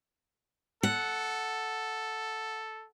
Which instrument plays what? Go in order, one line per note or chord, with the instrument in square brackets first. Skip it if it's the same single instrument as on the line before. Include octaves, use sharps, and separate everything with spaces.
[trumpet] A4 [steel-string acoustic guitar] F#5